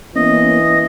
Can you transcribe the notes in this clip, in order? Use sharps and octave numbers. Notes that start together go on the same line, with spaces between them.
E3 A#3 B3 C#4 D#5